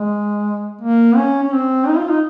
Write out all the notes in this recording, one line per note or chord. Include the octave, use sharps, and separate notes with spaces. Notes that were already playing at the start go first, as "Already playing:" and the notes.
Already playing: G#3
A#3
C#4
C#4
C4
D#4
F4
D#4